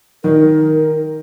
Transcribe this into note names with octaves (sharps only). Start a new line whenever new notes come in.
D#3 A#4